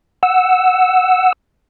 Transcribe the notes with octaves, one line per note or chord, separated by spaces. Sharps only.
F#5 E6